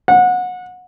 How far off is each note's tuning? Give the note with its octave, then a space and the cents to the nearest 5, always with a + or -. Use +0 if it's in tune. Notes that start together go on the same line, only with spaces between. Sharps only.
F#5 -25